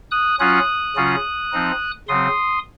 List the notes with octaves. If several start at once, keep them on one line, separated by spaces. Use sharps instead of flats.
D#6 F#6
F#3 C#4 F4 D#6 F#6
C#3 F#3 C#4 F4
F3 C4 D#4
C#3 F#3 C4 C6 D#6